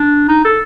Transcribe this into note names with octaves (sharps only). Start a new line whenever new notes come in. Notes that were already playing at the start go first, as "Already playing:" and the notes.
Already playing: D4
D#4
A4